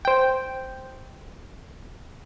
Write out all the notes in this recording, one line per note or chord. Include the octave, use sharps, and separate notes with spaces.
C5 G5